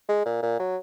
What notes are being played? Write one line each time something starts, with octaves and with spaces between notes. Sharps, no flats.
G#3
A#2
A#2
F#3